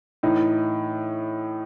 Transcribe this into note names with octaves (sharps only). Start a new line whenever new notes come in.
A2 E3 D#4